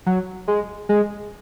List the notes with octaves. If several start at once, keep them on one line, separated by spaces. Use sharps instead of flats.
F#3
G#3
G#3